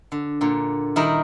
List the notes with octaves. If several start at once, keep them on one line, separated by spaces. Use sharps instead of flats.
D3
A#2 D3
D#3 G3 E4 A#4 D#5